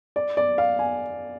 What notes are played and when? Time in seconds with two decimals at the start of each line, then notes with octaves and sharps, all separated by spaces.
0.16 D5
0.37 D5
0.58 F5
0.79 G#5